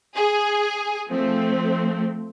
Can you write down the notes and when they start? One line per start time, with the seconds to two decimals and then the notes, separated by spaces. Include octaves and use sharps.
0.15 G#4
1.10 F3 A3 C4